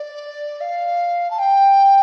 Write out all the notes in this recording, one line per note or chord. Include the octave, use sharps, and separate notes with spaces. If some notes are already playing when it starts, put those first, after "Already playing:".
Already playing: D5
F5
A5
G5